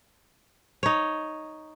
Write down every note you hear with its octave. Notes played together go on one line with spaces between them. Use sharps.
D#4 C#5